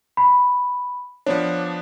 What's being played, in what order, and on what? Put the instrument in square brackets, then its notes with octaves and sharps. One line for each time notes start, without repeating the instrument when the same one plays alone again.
[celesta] B5
[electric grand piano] F3 B3 D4 [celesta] C#5